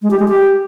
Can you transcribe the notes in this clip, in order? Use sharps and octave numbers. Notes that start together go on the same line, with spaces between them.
G#3
G4
G#3
G4